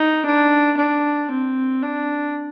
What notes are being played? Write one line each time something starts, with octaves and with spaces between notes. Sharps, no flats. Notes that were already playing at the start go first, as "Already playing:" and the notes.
Already playing: D#4
D4
D4
C4
D4